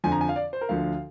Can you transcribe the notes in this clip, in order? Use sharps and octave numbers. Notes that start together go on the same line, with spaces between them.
F2 D3 F3 G#5
A#5
G#5
F5
D5
C5
A#4
D2 D3 F3 F5